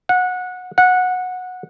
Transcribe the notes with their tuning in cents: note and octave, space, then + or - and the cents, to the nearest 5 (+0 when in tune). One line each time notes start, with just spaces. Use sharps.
F#5 -20
F#5 -15